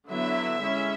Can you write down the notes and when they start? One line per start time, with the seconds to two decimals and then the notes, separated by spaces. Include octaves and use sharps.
0.10 D3 F#3 B3 E4 E5
0.61 G#3 C#4 E4